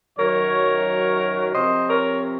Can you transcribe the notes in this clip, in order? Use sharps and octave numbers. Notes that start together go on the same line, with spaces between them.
F#2 D#3 F#3 A#4 C#5
C3 F3 C5 D#5
A#4 C#5